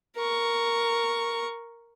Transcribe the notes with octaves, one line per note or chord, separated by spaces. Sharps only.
A#4 C#6